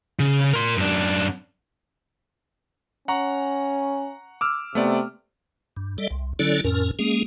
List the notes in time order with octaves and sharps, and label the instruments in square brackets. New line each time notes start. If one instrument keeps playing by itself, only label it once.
[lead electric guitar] C#3
A#4 C6
F#2 D4
[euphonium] C#4 [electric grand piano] F#5 A#5 C#6
[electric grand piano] D6 E6 F6
[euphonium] C3 [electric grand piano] A3 B3 D5
[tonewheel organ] G2
G3 A4 D5 D#5
C2
D3 F#3 C#4 E4 A4 D5
F2 A2 C#4 A#4
G#3 A#3 C#4 G#4